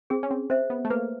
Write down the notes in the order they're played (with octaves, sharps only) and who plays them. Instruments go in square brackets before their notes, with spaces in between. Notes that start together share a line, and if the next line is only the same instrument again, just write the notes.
[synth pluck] C4 [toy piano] G#4
[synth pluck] C#4
C4
[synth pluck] C4 [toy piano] C5 E5
[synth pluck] B3
A3
[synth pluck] A#3 [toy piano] B4